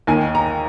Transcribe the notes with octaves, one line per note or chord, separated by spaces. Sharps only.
D#2 D#3 G#5
A#5